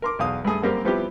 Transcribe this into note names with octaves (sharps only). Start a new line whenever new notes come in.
A#4 C6 D6
B1 E2 F5 D#6
G2 A3 G#4 D#6
F#2 G3 A#3 C4 G4 A#4
F3 G3 B3 C4 E4 G4